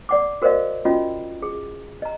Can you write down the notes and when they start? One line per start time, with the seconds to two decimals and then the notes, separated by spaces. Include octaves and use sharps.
0.09 D5 F#5 D6
0.42 F#4 A#4 C5 D5 D#5 F5
0.85 C#4 F4 F#4 D#5
1.42 G#4
2.02 D#5 A#5